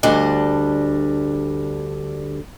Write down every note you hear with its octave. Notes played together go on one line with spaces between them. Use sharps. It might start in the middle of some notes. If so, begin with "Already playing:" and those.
D2 G3 D4 D#5